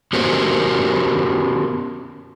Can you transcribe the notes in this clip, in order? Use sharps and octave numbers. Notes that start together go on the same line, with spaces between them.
B3 C#4 F#4 G4 A#4 C5